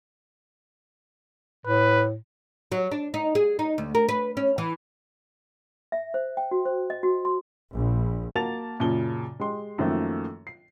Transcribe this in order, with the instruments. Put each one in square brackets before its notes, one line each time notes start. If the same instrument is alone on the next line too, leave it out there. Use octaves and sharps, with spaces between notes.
[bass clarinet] A2 [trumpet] B4
[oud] F#3
D4
D#4
G#4
D#4
D2
A#4
B4
C#4
E3
[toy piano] E5
C5
G5
F#4
C5
D#5
F#4
C6
[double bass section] A#1
[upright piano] A#3 F#4 A#4 A5 A6 F7
F#2 A#2 C#3 A5 G7
G#3 G4 C6
F#2 D#3 F3 A3 A#3
C7